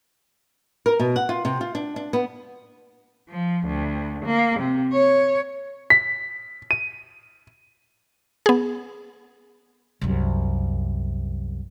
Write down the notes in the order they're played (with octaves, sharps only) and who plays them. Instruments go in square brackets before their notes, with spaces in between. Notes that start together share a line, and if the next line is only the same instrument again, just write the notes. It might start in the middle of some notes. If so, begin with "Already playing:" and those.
[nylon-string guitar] A#4
B2
F#5
F4
C3
F4
D4
D4
B3
[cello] F3
D2
A#3
C3
C#5
[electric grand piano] B6
D#7
[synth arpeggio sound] B3 G#4
[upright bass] C2 F#2